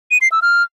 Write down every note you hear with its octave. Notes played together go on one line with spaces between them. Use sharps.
D#7
C7
E6
F6